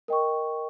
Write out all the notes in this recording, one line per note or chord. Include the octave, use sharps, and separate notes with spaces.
A#4 D#5 G5 C#6